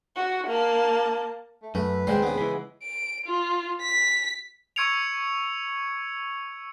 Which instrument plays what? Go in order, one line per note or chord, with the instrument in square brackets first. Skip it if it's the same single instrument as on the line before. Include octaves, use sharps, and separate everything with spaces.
[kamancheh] F#4
A#3 A5
[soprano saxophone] A3
[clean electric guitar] F#2 [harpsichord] A3 [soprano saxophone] B4
[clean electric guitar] D#2 G#3 C4 [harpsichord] G#2 G3 C6
[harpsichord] C#3 B3
[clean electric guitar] E3 G#3 [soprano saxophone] B5
[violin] D7
F4
B6
[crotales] C#6 E6 G#6 C#7 D7 F7